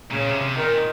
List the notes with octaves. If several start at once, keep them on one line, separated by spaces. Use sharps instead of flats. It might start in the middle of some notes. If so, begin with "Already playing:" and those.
A#2 C#3
C3
C3
A#2 D#3